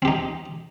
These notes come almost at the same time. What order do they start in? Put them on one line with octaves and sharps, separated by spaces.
C4 G4 D#4